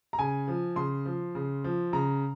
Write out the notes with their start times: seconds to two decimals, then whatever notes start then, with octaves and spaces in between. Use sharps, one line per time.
0.13 A#5
0.18 C#3 G#5
0.48 F3
0.76 C#3 C6
1.06 F3
1.35 C#3
1.64 F3
1.93 C#3 A#5